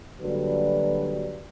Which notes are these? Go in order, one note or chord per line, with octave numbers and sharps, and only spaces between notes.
D3 F#3 G3 A#3 F#4 B4